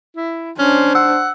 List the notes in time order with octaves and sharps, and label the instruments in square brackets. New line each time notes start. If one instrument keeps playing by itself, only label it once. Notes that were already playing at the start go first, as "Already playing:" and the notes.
[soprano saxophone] E4
[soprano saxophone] C#4 [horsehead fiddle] D4 C5
[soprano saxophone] F#5 [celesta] E6